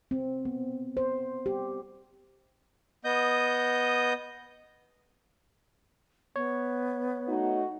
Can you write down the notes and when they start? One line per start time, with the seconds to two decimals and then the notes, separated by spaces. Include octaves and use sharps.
0.11 C4
0.45 B3
0.97 C5
1.46 G4
3.05 B3 D#5 D#6 G6
6.36 B3 C#5
7.28 A3 D#4 F#4